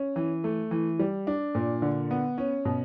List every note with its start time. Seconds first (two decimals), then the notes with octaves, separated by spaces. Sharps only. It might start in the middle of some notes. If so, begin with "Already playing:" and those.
Already playing: C#4
0.16 E3
0.44 A3
0.71 E3
0.99 G3
1.27 D4
1.55 A#2
1.82 D3
2.11 B3
2.38 C#4
2.65 B2